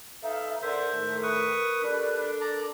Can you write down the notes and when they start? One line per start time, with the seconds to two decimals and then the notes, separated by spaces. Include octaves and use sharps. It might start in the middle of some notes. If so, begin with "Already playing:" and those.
0.23 D#4 A4 B4 E5 F5
0.62 D3 A#4 C5 E5
0.93 A2 D#3 A3
1.23 B4 C#6 D#6
1.84 G3 D4 A4 B4
2.41 D5 A5 A#5